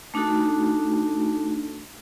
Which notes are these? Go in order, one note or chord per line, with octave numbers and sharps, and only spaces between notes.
A3 D4 D#4 F#4 A4